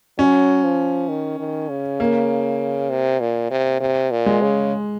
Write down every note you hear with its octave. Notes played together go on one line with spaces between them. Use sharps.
F#3 C#4
F3
D#3
D#3
C#3
A#3
C3
A#2
C3
C3
A#2
G#3
C#3